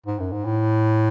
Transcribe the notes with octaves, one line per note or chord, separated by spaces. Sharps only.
G#2
F#2
G#2
A2